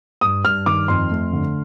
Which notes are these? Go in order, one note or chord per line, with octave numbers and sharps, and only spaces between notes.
G2 D#6
G2 F6
D#3 D6
F2 C6
A3
D3